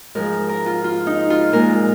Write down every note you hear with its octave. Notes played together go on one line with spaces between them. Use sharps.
G#2 F3 G#3 A#4
A#4
F4
F4
D#4
F4
A#2 G#3 A#4